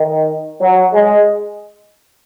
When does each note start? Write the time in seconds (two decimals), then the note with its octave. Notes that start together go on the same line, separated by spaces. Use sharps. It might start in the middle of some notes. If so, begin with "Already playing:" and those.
Already playing: D#3
0.60 F#3
0.93 G#3